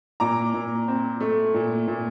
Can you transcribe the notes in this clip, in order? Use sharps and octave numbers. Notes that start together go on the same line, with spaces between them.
A#2 A#5 D6
A#2
C4
A3
A#2
A#2